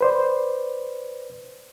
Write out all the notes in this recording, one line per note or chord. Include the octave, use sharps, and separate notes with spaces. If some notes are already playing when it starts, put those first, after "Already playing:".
B4 C5 D5